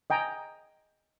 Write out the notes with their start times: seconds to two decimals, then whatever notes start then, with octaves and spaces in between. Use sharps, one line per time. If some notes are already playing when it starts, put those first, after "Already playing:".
0.10 D#5 G5 G#5 A#5